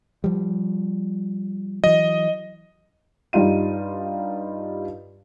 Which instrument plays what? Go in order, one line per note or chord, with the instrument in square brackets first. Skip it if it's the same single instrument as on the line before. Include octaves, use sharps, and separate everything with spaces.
[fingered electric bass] F3 G3
[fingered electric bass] E3 F#3 [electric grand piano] D#5
[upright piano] G2 G3 D#4 F4 D#7